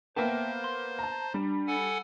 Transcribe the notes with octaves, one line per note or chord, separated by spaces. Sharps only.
A#3 B3 C5 E5 G5 A5
C6
A5 A#5
G3 D4
A4 F#5 G#5